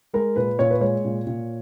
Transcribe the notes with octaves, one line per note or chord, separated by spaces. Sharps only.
G#3 A#4
A#2 B4
A#2 C#5
B4
G#3 C#5
A#2
A#2